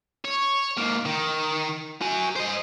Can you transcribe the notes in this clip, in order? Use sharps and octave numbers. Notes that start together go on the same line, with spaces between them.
C#5
G#2 A#3
D#3
F#4 G#5
C5 D#5